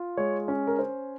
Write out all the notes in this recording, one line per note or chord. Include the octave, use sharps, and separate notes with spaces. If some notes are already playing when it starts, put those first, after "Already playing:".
Already playing: F4
G#3 C#5
C#4
A#4
C#4 C5